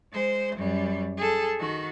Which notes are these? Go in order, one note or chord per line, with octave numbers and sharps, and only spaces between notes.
G#3 C5
F#2 G3
G#4 A4
D#3 F#4